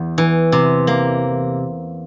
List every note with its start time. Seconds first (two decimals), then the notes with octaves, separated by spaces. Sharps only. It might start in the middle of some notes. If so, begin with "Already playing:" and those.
Already playing: E2
0.18 E3
0.52 C3
0.87 A#3